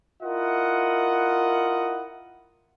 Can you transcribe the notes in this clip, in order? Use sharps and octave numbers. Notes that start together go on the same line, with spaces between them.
E4 F4 A#4 D#5 F#5